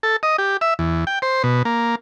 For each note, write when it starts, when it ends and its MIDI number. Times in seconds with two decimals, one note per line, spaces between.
0.03 0.16 69
0.23 0.36 75
0.38 0.57 67
0.61 0.74 76
0.79 1.05 40
1.07 1.19 79
1.22 1.43 72
1.44 1.63 47
1.65 1.95 58